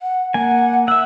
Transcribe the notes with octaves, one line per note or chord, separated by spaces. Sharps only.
F#5
A#3 F#5 G#5
E5 F#5 E6